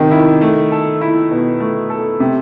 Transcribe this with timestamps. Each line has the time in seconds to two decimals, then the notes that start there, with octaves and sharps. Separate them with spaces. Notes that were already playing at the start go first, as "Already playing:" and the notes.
Already playing: C3 D#3
0.11 E4
0.41 A3
0.72 A4
1.01 E4
1.31 B2
1.60 A3
1.90 A4
2.20 C3